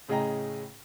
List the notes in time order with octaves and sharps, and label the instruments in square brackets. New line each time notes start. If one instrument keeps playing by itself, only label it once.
[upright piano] A2 C#3 G#4 D#5 G5 A#5